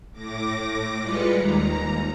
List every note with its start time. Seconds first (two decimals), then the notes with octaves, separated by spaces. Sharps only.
0.12 A2 D6 A#6
1.01 G3 G#3 F4 B4 C#7
1.34 D#2 A#5